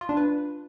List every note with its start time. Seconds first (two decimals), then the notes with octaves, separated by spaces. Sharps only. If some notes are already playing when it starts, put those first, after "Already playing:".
0.01 F4
0.09 D4
0.17 B4